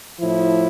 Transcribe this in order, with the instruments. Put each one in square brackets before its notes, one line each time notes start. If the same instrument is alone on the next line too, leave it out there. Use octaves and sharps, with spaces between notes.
[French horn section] A2 F3 E4